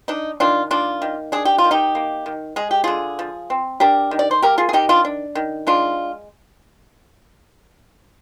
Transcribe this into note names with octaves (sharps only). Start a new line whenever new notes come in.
D4 D#4
D#3 D4 F4
A#3 D4 F4
D#3
D4 G#4
G4
F4
D#3
D#4 G4
A#3
D#3
G#3 G#4
G4
D3 F4 G#4
F3
C4
D4 G4 A#4
D#3
D5
C5
A#3 G4 A#4
F4 G#4
G#4
D#3 D#4 G4
D4 F4
D4
D#3
G#3 D4 F4